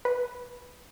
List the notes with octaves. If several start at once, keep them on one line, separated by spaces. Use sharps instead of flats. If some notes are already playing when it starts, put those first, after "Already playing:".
B4